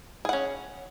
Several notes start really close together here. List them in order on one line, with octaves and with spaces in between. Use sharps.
G#4 F#5 C#4